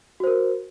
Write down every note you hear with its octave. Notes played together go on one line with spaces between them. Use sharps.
F#4 A#4 C5